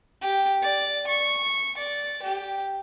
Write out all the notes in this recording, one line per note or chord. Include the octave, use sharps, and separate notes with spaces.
G4
D5
C#6
D5
G4